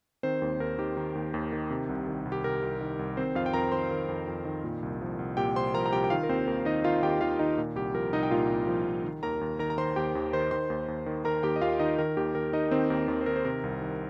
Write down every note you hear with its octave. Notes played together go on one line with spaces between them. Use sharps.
D#3 C4 C5
D#2
D#2 A#4
D#3 G4
D#3
D#2
D#2
D#3
C3
C2
D#3
C2
G4
C3 A#4
C2
D#3
C2
D#3 C4 C5
F2 F4 F5
G5
F2 A#4 A#5
D#3 C5 C6
D#3
F2
F2
D#3
A#2
C2
F3
C2
A#2 G4 G5
C2 C5 C6
F3 A#4 A#5
A#5
C2 G4 G5
G5
D#3 F4 F5
A#4
D#2 C4 C5
D#2 A#4
D#3 D#4 D#5
D#3 F4 F5
D#2 G4 G5
D#2 F4 F5
D#3 D#4 D#5
A#2
C2 G4
F3 A#4
C2 D#4 D#5
G5
A#2 F4 F5
C2
F3
C2
D#3
D#2 A#4 A#5
D#2
D#3 A#4 A#5
A#5
D#3 C5 C6
D#2 G4 G5
D#2
D#3 C5 C6
D#3 C5 C6
D#2
D#2
D#3
D#3 A#4 A#5
D#2 G4 G5
D#5
D#2 F4 F5
D#3 D#4 D#5
D#3 A#4
D#2 G4
D#2 A#4
D#3 D#4 D#5
D#3 C4 C5
D#2 A#4
D#2 A#4
C5
D#3 A#4
C5
C3 A#4
C2
D#3